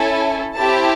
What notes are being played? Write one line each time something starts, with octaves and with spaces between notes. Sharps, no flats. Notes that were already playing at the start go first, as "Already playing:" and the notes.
Already playing: C#4 E4 A4 G#5
C4 E4 G4 A5